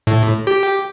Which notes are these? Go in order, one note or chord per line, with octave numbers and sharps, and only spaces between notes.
A2
G4